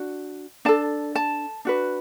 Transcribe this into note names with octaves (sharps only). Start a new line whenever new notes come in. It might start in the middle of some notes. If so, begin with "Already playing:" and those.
Already playing: D4 F#4
D4 A4 A5
A5
D4 F#4 B4